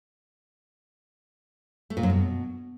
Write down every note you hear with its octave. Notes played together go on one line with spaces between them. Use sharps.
A3
A#2
F#2
B2